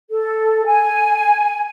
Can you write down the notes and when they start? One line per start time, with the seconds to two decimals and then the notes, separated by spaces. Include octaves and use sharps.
0.10 A4
0.66 G#5